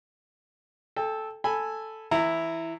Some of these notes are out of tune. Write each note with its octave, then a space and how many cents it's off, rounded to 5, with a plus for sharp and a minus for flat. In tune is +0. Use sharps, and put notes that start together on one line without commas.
A4 -10 G5 +25
A4 +0 G#5 -5 B5 +0
E3 +0 E4 +0 A#5 -25